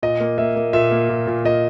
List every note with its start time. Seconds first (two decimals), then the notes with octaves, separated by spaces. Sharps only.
0.03 A#2 D#5
0.20 A#3
0.38 A#3 E5
0.56 A#3
0.73 A#2 E5
0.91 A#3
1.09 A#2
1.27 A#2
1.45 A#2 D#5